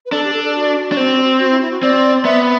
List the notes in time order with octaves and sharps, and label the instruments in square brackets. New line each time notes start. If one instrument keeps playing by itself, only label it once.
[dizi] B4
[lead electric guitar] D4 [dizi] A4
[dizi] G4
A4
A4
F#4
[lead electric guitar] D4
C4
[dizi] F#4
E4
E4
F#4
[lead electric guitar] C4 [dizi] D5
[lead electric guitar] B3 [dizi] E5